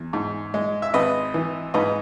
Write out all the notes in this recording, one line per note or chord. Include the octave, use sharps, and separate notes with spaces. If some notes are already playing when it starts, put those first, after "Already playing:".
Already playing: E2
G#2
G#3
E5
G#1 B4 D#5
E3
G#2 B4 D#5